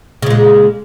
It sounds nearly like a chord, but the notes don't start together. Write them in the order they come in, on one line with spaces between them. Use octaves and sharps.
C#3 A#2 G#3